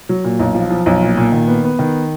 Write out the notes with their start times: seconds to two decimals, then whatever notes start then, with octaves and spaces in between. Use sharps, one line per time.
0.09 F#3
0.24 A#2
0.39 B1
0.55 F3
0.70 F3
0.86 B1
1.02 A#2
1.18 A#2
1.32 D#3
1.48 B3
1.64 B3
1.79 D#3